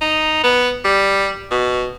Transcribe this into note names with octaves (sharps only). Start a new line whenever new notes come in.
D#4
B3
G3
B2